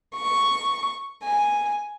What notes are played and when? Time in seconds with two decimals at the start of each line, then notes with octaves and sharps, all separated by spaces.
0.15 C#6
1.22 G#5